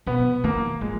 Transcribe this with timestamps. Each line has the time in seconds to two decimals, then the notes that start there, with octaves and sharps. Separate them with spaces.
0.07 B2 B3
0.44 D#3 A#3
0.81 F3 G#3